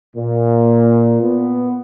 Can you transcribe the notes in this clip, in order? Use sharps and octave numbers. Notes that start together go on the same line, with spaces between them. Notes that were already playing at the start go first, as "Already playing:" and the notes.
A#2
B3